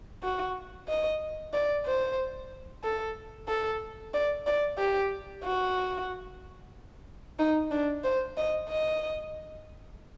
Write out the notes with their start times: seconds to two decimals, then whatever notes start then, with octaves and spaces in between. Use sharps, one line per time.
0.23 F#4
0.88 D#5
1.53 D5
1.86 C5
2.84 A4
3.48 A4
4.14 D5
4.46 D5
4.78 G4
5.44 F#4
7.39 D#4
7.71 D4
8.04 C5
8.37 D#5
8.69 D#5